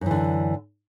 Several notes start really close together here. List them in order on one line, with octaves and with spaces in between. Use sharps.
F#2 E3 D3